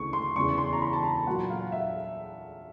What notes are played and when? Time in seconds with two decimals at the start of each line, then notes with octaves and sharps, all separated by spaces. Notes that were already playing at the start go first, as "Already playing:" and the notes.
Already playing: D2 C#3 E3 C#6
0.13 C6
0.36 E2 C#3 E3 C#6
0.58 C6
0.73 A#5
0.82 B5
0.93 A5
1.04 A#5
1.27 A#2 F#3 A#3 F#5
1.50 F5
1.72 E5